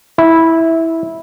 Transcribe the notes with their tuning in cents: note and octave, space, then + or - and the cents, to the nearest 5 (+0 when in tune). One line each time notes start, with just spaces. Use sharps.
E4 -10